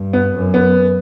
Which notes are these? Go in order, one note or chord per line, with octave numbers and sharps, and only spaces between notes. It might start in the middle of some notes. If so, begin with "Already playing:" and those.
Already playing: G2
B3
F#2
B3